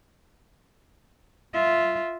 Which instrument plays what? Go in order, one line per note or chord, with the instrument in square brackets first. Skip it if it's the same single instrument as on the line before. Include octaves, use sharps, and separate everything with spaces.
[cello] F4 E5